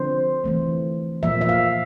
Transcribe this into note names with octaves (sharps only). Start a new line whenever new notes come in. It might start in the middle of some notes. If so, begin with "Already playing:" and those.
Already playing: D3 F3 C4 C5
E3 A3 C4
A#2 F3 A#3 E5
E5
F5